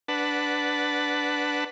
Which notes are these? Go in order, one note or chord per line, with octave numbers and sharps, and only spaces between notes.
D4 B4 F#5 A5